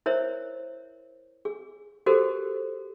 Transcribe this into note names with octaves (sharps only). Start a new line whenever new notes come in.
E4 A#4 C5 C#5 E5
G#4
F#4 G4 A4 A#4 C5